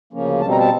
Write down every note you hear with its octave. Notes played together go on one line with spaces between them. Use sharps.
D2 C#3 F3 A#3 C#4
B2 G3 C4 A5
A#5
A5